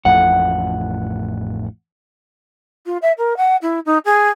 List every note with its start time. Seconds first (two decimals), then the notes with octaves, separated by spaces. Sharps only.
0.05 A1 F2 A2 F#5
2.86 F4
3.02 E5
3.18 A#4
3.37 F#5
3.62 E4
3.85 D#4
4.05 G#4